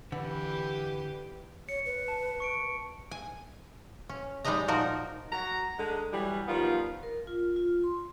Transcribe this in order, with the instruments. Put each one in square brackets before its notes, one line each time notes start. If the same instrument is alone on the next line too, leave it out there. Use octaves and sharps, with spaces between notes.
[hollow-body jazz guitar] D3 [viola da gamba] E3 G4 [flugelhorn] B4
[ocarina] C#5 [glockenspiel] C#7
[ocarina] B4
[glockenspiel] A5
C#6 C#7 D7
[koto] G#5
C#4
G3 G#3 D#4 B4 D#5 A#5
A#2 F3 D#4 F#4 A#4
[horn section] F#3 F#4 A#5
D3 G#3
E3 F#3 G3
D#3 F3 G3 B3 F4
[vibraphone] A#4
F4
F4
C6